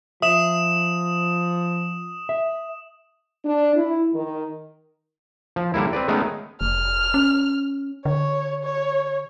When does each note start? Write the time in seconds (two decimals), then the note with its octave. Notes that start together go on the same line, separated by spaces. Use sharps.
0.22 F3 E5 D#6 E7
2.29 E5
3.45 D4
3.76 E4
4.13 D#3
5.56 F3
5.74 D3 G3 A#3 E4
5.93 C4 B4 D5
6.08 D#3 G#3 A3 B3 C#4 D#4
6.61 F1 F6
7.14 C#4
8.05 D3 C#5
8.64 C#5